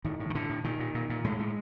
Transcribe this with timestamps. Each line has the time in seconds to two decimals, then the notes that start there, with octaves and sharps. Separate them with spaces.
0.05 A2 D#3
0.20 A2
0.30 D#3
0.35 A2 D3
0.50 A2
0.64 A#2 D#3
0.80 A#2
0.95 A#2
1.10 A#2
1.24 A2 G#3
1.39 A2